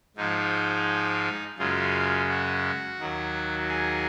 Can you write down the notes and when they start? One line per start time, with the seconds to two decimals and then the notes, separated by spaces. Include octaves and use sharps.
0.17 G#2 F3 G#3 D#4
1.58 F#2 C#3 G#3 F4
2.28 F#4
2.99 D#2 D#3 F#3
3.69 G#4